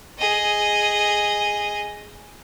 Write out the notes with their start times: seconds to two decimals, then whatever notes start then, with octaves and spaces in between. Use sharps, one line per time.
0.19 G#4 D#5